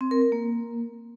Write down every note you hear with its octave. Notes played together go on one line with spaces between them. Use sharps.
C4
A#4
A#4
A#3